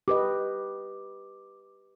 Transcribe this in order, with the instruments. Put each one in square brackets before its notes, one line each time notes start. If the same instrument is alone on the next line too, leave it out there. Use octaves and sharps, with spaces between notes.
[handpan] G4 B4 D#5 [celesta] D6